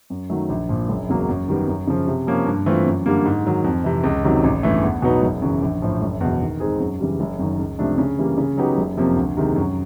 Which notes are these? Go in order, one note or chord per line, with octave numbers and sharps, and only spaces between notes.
F#2
D#3 F#3 A3
A#1
A#2 F3
F#1
E2 C#3 F#3 A#3
F#2
D#3 G3 B3
F#2
C#3 F3
C3
F3 A#3 C#4
G2
E3 A3 C4 F4
F#2
D3 G3 A#3
G#2
D#3 F#3
F2
C3 E3
C#2
C3 D#3 F#3
A1
G2 E3 A3
E2
B2 F#3 B3 D#4
F#1
F#2 C#3 E3
A#1
A2 F3
F#1
E2 B2
D#3
G#3 C4 D#4 G#4
F#2
C#3 E3 G3
F#1
F#2 D#3
C#2
C3 F3 A3 D4
C#3
E3 G3 A#3
C#3
F#3 B3 D#4 G4
F#1
F2 C3 F3 A#3
D2
C3 D#3 G#3
F#2